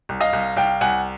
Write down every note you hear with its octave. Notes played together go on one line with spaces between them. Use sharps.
C2
D#5 F5
C2
C2 F5 G5
C2 F#5 G#5